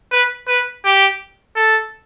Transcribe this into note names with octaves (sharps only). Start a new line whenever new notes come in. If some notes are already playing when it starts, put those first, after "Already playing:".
B4
B4
G4
A4